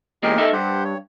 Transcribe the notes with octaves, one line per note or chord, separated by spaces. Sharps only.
E2 A#2 G#3 G4 A#4 D#5
D#4 A4 E5
G2 G4 C5 F#5
C#5